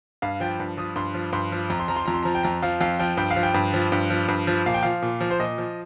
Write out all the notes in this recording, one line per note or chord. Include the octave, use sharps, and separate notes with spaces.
G2 F5
F3 G5
G2
F3 D#6
G2 C6
F3
G2 C6
F3
F2 A#5
C6
F3 A#5
C6
F2 A#5
C6
F3 A#5
G5
F2 A#5
F3 F5
F2 F5
F3 G5
G2 G5
F5
F3
G5
G2
F3
G2
F3
G2
F3
A#2 F5
G5
F3 F5
A#2
F3
C5
A#2 D#5
F3